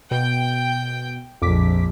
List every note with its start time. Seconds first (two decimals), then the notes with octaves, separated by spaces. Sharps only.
0.11 B2 G5
1.42 A#1 F2 D6 B6